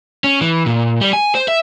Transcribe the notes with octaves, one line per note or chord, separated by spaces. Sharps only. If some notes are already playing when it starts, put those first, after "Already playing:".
C#4
E3
A#2
G3
G#5
C5
E5